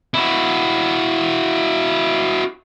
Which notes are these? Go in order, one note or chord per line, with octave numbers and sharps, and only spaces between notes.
E4 F#4